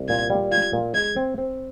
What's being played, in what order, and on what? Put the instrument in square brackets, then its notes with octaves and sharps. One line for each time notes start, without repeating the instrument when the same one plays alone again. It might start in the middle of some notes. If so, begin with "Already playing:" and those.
Already playing: [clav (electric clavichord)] C2
[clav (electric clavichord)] A#2 [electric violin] G#6
[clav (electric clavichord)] G3
[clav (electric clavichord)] F4 [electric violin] G#6
[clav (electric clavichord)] A#2
[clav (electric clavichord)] G#3 [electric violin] G#6
[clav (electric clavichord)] C4
C4